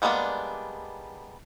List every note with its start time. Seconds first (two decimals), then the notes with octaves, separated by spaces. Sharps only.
0.02 G3 G#3 A#3 B3 D4